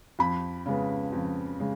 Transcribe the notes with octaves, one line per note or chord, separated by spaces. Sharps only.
F2 B5
C#3 G#3 B3
F2
C#3 G#3